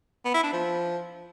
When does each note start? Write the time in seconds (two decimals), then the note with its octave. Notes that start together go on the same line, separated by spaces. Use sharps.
0.25 B3
0.34 E4
0.43 D4
0.53 F3